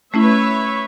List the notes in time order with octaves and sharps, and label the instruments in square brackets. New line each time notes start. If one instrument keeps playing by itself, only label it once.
[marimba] A3 C#4 E4 [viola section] B4 C#5 E5